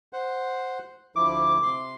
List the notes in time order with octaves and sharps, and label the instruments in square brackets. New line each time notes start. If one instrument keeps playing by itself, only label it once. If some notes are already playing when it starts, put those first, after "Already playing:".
[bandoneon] C5 F#5
[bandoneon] D2 F3 E4 [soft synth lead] D6
[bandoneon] C3 C6